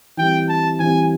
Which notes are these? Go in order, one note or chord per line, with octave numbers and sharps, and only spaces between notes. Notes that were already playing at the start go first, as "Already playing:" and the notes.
E3 G3 C4 G5
A5
E3 G3 C4 G#5